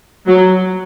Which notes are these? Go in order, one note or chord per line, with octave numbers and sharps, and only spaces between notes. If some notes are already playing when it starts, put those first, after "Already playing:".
F#3